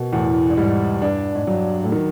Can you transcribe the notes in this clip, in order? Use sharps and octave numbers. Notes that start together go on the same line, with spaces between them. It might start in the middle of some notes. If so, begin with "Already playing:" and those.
Already playing: B2 A#3
E2 A2
G2
G#2 G3
G2 D4
G#2
G2 F#3
A2
D#3